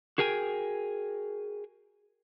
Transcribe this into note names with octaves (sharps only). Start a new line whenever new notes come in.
F#4 G#4 A#4 G5 G#5